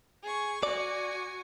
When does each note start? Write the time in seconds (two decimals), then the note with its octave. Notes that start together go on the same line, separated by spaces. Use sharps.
0.22 G#4 C#6
0.63 F#4 D5 G#5